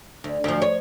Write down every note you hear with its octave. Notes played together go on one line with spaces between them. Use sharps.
D2
D2 F3
C#5